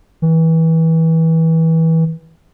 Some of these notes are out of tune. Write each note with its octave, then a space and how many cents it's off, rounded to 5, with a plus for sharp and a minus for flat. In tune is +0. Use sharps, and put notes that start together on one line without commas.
E3 -25